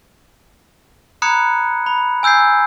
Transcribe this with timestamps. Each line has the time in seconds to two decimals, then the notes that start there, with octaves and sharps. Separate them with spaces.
1.22 A#5 B5 D#6 F#6 G#6 C#7
1.86 B5
2.23 G#5 E6 G6 G#6 C7